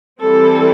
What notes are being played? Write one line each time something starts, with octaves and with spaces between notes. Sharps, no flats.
E3 G3 C4 A4